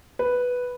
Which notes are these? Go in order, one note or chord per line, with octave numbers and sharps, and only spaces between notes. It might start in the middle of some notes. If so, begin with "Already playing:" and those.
B4